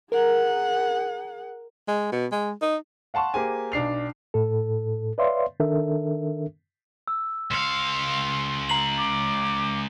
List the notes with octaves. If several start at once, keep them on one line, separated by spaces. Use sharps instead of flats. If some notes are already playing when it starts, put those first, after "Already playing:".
G#4 A#4 F#5
G#3
B2
G#3
D#4
F5 F#5 A5 C6 C#6
A#3 G4 G#4 C5 G#5
B1 D4 C7 F7
A2 A4
B4 C#5 D5 E5 F5 C6
D#3 D4 A4 A#4 E5
E6
C#2 F5 C6 C#7 E7
A#5 C7 F#7
D6